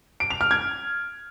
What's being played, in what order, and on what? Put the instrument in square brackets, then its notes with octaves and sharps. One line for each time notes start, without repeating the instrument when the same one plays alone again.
[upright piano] D7
F7
F6
G#6